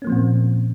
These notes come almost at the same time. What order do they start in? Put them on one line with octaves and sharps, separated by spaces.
C#4 A#3 F3 C4 A#2